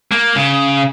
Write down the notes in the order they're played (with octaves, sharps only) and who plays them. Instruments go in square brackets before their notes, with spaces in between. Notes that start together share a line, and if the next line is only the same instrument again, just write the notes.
[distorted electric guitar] A#3
C#3